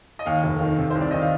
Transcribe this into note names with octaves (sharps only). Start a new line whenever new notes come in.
D#5
D#2 F5
F1
D#3
C3
C2 C5
D5
D#3 D#5
F5